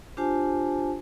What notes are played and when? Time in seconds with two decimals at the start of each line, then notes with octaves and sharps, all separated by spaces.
0.17 D4 F4 G4 C5 G#5 A5